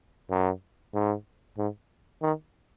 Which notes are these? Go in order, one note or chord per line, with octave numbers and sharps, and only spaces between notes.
F#2
G#2
G#2
D#3